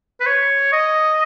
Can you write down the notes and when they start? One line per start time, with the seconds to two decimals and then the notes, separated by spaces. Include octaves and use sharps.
0.20 B4
0.26 C#5
0.73 D#5